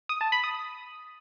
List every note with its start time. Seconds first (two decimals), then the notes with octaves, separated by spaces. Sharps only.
0.09 D#6
0.21 A5
0.32 B5
0.44 D#6